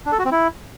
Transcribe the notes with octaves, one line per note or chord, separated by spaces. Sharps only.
D4
A4
F#4
C4
E4